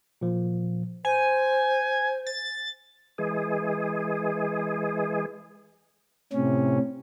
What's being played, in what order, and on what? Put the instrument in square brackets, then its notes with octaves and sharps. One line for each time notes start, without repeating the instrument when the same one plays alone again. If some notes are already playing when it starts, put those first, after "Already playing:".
[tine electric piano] A#2 F3
[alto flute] C5 [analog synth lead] G#5
[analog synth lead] A6
[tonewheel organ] E3 G#3 G#4
[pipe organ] A2 C3 C#4